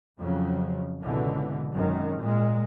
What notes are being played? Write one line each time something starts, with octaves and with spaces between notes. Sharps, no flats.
F2 C#3 F3 F#3
G#1 C#2 B2 D3 E3
G#1 F#2 D#3
A#2 G#3